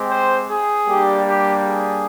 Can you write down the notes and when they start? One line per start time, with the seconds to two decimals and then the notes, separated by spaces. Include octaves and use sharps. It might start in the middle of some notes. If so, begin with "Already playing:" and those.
Already playing: G#3 C4 G4
0.10 C5
0.49 G#4
0.87 G3 A#3 D4 G4
1.26 G4
1.65 G#4